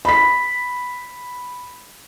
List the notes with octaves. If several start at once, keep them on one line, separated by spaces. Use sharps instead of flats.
B5 B6